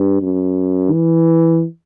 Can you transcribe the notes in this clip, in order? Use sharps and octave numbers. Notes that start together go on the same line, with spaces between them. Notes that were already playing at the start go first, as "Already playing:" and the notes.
Already playing: G2
F#2
E3